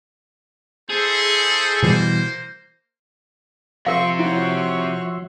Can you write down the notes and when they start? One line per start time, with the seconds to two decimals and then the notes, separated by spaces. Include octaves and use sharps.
0.90 E4 G#4 A4 C5
1.82 B2 E3 G3 A#3 C5
3.86 C3 F3 A#4 C5 E5 F5 C6 C#6
4.19 E4 F#4 C#5